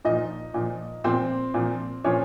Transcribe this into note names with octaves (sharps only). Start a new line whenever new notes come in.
A#2 F3 D#4 D#5
A#2 F3
A#2 F3 C4 C5
A#2 F3
A#2 F3 C#4 C#5